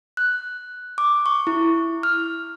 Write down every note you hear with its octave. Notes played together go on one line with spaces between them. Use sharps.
F#6
D6
C#6
E4
F6